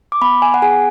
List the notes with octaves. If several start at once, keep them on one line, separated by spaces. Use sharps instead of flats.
D6
B3 B5
G#5
F#5
G#4 G#5